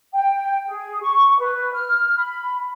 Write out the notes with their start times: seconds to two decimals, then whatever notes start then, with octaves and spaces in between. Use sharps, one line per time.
0.13 G5
0.67 G#4
1.01 C#6
1.38 B4
1.72 F6
2.16 B5